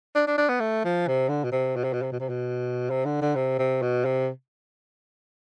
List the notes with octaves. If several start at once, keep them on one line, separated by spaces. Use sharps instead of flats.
D4
D4
D4
B3
A3
F3
C3
D3
B2
C3
B2
C3
B2
C3
B2
C3
B2
C3
D3
D3
C3
C3
B2
C3